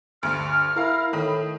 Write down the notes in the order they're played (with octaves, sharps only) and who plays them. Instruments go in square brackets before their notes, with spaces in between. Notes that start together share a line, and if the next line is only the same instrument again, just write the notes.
[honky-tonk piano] D2 G2 [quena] F6
[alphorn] E4 [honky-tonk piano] A#4 F5
[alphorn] A2 [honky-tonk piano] D#3 B5 D#6